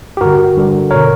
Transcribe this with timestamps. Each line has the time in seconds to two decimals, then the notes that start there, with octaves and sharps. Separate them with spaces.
0.17 G4
0.21 G2 D3 F#4 A#4
0.57 G2 D3
0.91 B2 A#4 C#5